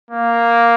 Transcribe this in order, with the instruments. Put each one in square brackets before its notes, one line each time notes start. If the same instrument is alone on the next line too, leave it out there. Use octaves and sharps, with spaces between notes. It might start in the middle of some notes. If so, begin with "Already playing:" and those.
[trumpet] A#3